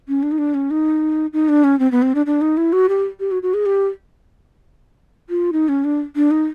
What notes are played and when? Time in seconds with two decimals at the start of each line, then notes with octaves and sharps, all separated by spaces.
0.08 C#4
0.23 D4
0.32 D#4
0.38 D4
0.54 C#4
0.71 D#4
1.33 D#4
1.49 D4
1.64 C#4
1.79 C4
1.91 B3
2.02 C4
2.15 D4
2.26 D4
2.41 D#4
2.57 E4
2.73 F#4
2.89 G4
3.20 G4
3.31 F#4
3.43 F#4
3.54 G#4
3.66 G4
5.29 F4
5.53 D#4
5.69 C#4
5.84 D4
6.16 D4
6.31 D#4